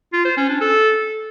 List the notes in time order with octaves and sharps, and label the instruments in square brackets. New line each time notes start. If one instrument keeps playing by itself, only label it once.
[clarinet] F4
C5
C#4
D4
A4